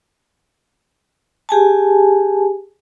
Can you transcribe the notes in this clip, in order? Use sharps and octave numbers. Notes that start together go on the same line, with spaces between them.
G4 G#4 G#5 A5